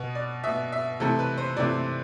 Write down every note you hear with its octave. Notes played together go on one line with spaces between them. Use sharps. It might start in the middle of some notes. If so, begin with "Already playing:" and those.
Already playing: B2 B3 B4
D5
B2 B3 E5
E5
C3 E3 A3 C4 A4
B4
C5
C3 E3 A3 C4 D5